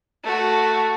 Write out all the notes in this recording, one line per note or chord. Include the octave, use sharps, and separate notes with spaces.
A3 F#4